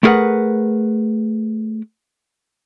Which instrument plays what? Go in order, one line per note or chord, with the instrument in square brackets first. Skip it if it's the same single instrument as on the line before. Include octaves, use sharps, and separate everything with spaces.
[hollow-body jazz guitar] A3 E4 G#4 A#4 B4 F#5